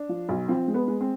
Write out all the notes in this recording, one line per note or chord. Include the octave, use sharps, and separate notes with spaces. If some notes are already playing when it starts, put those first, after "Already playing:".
Already playing: D4
F3
B1
F3 C4
G#3
B3
G#3
C4